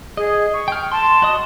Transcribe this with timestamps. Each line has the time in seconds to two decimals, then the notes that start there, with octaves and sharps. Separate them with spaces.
0.17 G#4 D#5
0.53 C#6
0.68 G5 F6
0.92 A5 C6
1.22 F#4 D#5 D#6